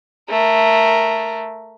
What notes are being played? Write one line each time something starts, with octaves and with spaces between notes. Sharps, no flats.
A3 A#4